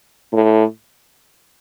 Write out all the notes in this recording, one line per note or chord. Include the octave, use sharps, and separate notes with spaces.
A2